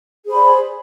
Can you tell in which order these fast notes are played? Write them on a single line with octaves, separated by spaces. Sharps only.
G#4 C5 B5 D5